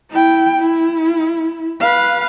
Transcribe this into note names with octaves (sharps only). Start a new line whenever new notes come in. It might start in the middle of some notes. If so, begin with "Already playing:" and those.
E4 G5
E4
B4 F5